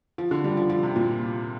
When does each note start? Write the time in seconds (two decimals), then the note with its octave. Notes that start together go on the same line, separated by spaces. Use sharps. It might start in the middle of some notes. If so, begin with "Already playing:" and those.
0.18 F3
0.31 D3
0.44 G3
0.57 F3
0.70 F3
0.83 C3
0.96 A#2